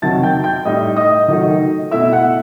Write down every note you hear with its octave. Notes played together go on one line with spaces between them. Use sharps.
C3 D#3 F#3 A5 A6
G5 G6
G5 G6
A2 G3 D#4 D#5 D#6
D#5 D#6
D#3 F#3 A3 D#4
B2 A3 E4 E5 E6
F#5 F#6